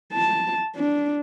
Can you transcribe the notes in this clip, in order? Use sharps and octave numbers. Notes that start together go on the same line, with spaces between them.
A5
D4